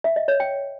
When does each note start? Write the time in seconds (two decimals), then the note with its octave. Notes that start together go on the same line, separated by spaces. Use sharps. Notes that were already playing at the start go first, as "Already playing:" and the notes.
0.04 E5
0.16 D#5
0.28 C#5
0.40 G5